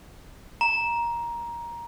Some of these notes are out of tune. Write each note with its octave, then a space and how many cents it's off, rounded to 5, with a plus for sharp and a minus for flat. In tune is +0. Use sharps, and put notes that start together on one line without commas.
A#5 +15